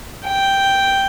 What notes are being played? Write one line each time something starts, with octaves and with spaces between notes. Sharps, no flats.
G5